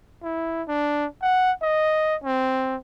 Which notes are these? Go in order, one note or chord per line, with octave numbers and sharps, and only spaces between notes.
E4
D4
F#5
D#5
C4